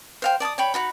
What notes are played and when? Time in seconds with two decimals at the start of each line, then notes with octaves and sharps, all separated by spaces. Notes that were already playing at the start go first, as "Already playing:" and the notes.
0.22 C5 F5 G5
0.40 D5 A5 D6 D#6
0.58 C#5 G5 B5
0.74 D#4 F#4 B5